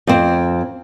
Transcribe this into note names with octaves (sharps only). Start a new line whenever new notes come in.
F2 C4